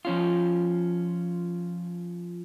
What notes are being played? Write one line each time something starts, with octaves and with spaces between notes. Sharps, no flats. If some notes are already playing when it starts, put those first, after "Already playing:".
F3 C#4 F4